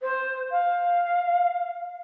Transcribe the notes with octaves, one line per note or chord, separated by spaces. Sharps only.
C5
F5